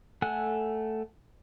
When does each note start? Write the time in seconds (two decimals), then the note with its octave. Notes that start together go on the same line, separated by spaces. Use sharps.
0.22 A3 A4 F#5 G#5 F#6